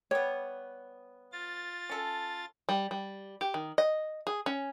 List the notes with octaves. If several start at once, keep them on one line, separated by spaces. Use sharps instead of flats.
G3 B3 C#5
F4 A6
C#4 A4
G3
G3
G4
D#3
D#5
G#4
C#4